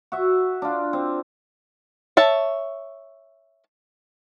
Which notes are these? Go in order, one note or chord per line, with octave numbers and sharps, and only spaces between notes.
F#4 E5
D4 F4
C4
C#5 E5 A5